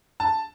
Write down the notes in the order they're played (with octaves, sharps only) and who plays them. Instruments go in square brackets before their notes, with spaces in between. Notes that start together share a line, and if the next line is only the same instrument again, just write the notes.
[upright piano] A5